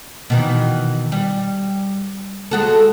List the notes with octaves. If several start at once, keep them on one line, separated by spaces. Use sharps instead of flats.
B2 D#3 E3
G3
G#3 F#4 A4